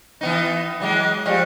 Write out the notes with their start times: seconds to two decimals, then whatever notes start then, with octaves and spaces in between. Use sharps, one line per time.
0.21 E3 B3 D#4
0.80 E3 F#3 G#3
1.26 F3 G3 G#3